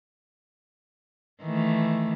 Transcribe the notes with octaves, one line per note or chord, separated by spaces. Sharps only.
D#3 E3 A3